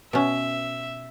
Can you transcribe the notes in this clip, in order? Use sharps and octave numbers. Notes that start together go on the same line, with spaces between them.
B2 C#4 E5